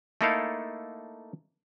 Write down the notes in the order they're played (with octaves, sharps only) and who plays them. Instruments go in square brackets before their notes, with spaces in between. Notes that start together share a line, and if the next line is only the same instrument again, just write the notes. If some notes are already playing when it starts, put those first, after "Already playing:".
[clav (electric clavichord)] A3 A#3 D#4 E4 A4 F5